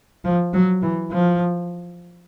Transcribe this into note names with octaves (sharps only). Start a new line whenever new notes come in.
F3
F#3
E3
F3